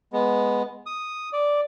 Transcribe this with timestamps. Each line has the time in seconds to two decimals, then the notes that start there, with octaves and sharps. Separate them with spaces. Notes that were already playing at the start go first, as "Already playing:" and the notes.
0.13 G#3 B3
0.86 D#6
1.33 D5